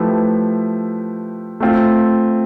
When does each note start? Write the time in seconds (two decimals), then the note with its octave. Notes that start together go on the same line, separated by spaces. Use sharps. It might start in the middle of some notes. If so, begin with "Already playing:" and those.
Already playing: F3 A3 E4 G4 B4
1.60 A3 C4 F4